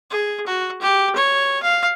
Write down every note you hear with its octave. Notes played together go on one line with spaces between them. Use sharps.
G#4
F#4
G4
C#5
F5